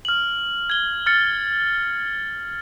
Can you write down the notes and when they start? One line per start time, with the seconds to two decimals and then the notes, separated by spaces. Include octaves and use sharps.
0.05 F6 F#7
0.70 G#6 G7
1.06 F6 A6 C#7